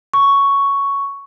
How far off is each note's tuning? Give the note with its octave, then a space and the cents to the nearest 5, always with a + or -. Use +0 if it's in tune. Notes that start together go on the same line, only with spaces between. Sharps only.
C#6 +5